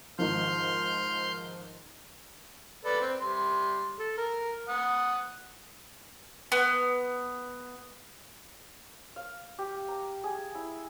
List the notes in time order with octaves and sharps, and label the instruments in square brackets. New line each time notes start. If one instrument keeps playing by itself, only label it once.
[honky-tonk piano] G#2 D#3 F3 [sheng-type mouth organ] C6 F6 G6
[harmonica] A4 B4 D5
C4
G3 C6
A4
A#4
F#5 D#6
[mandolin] B3
[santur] F5
G4
A#5
G#4
E4